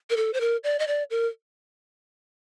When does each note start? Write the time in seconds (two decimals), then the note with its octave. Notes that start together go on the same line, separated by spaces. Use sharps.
0.10 A#4
0.17 A4
0.33 C5
0.41 A#4
0.64 D5
0.79 D#5
0.87 D5
1.10 A#4